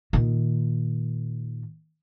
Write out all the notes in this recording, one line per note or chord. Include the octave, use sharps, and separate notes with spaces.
A#2 D#3